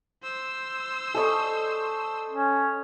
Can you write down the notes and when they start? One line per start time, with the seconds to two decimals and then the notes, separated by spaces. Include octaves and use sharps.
0.22 C5 E6
1.15 A4 D#5 C#6
2.30 C#4